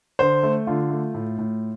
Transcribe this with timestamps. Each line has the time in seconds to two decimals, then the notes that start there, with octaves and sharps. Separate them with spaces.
0.19 D3 C5
0.43 A3
0.67 D3 F4
0.90 A3
1.14 A2
1.38 A2